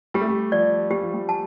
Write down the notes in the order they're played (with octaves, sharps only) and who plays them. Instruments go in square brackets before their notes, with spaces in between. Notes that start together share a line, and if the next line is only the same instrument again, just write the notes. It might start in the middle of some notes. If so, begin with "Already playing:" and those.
[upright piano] G3 [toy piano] G4
[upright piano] A3
G3
[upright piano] F3 [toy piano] D5
[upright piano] G3 [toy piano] G4
[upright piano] F3
G3
[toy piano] A5